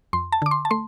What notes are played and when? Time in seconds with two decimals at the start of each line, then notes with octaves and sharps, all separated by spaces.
0.13 F2 C6
0.32 A5
0.42 D3 D6
0.51 C6
0.65 A5
0.71 A3 C6